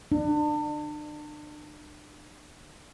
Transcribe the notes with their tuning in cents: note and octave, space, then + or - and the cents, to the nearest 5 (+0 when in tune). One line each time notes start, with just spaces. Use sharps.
D4 +35